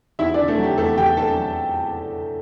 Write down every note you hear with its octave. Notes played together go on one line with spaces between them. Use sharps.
E2 E4 E5
D3 D4 D5
A3 A4
F#3
G4
E2 A3 A4
E2 G4 G5
D3 A4 A5
F#3